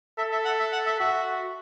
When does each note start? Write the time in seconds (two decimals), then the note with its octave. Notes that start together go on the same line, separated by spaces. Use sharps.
0.18 A4 E5
0.31 E5
0.45 F#5
0.59 E5
0.72 F#5
0.86 E5
0.99 F#4 E5